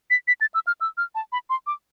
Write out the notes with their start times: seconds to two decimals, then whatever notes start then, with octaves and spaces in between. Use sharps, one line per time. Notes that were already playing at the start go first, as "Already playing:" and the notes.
0.10 B6
0.28 B6
0.41 A6
0.54 E6
0.67 F6
0.81 E6
0.97 F6
1.15 A5
1.32 B5
1.50 C6
1.67 D6